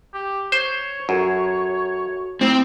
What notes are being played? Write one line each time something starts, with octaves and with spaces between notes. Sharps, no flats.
G4
C5 C#5
F#2 F#4 A4
A3 C4 E4 C7